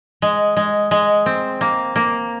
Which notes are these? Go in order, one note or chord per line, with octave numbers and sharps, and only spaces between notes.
G#3
G#3
G#3
C4
A#3
A#3